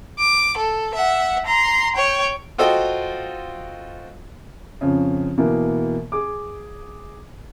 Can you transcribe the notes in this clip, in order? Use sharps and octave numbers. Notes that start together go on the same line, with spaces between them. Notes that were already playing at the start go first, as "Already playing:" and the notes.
D6
A4
E5 F#5
A#5 C6
C#5 G5
F4 F#4 A4 C5 D#5 G5
F2 C#3
B2 E3 A#3
G#4 D6